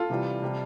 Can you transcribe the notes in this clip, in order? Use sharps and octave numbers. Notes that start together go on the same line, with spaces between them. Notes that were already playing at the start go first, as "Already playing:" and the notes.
Already playing: F4 A4
C3 E3 G3
C3 G3